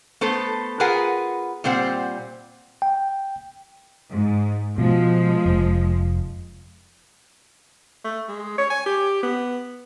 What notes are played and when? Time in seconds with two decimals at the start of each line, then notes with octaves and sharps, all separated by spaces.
0.21 A3 B3 A4 C5
0.80 F4 G#4 A#4 B4 F#5 G#5
1.64 A#2 G3 C4 C5 F#5
2.82 G5
4.11 G#2
4.78 B2 F3 G#3
5.46 F1
8.04 A3
8.28 G#3
8.58 C#5
8.70 G#5
8.86 G4
9.23 B3